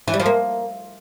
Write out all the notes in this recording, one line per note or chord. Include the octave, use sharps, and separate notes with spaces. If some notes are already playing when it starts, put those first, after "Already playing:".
E3
G3
F3
A#3